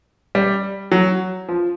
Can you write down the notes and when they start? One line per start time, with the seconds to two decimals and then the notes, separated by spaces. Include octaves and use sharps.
0.35 G3
0.92 F#3
1.49 F3